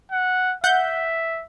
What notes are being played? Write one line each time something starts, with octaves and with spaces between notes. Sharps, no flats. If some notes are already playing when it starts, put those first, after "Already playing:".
F#5
E5 F#5 G6